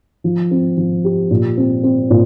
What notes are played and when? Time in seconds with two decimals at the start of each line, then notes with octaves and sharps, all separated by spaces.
0.24 F3
0.51 C4
0.77 F3
1.04 G4
1.30 A#2
1.57 C4
1.83 C4
2.10 A#2